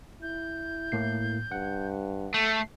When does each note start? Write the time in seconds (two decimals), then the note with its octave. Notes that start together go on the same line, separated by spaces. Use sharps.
0.22 E4 G6
0.92 A2 A#3 C7
1.52 G2 F#5
2.34 A3 C7